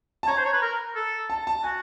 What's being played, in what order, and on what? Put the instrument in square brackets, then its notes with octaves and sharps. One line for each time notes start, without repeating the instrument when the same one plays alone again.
[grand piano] A5
[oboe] C#5 [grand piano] A#5
[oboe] C5
C#5
B4
A#4
A4
[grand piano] A5
A5
[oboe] F#4 [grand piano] G#5